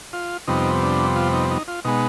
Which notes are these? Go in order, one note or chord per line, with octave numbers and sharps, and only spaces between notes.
F4
F2 C3 G3 B3 D#4
D4
F4
D#4
D#4
F4
B2 G#3 B3 D#4